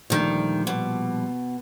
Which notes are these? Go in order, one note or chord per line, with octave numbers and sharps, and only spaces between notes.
D2 A#2 D#3 F3 G3
B2